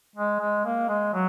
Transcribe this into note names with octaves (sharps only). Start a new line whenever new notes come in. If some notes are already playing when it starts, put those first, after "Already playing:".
G#3
G#3
A#3
G#3
F#3